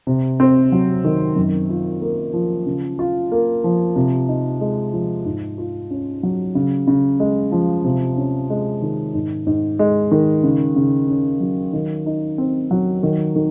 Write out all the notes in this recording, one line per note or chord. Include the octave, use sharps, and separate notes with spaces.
C3
C4
F#3
D#3
F#2
F4
A#3
F3
C#3
F4
A#3
F3
C3
D#4
G#3
F3
G#2
F4
C#4
F#3
C#3
C#3
G#3
F3
C3
C#4
G#3
D#3
G#2
G#2
G#3
D#3
C#3
C#3
C#4
F#3
D#3
D#4
C4
F#3
D#3
D#3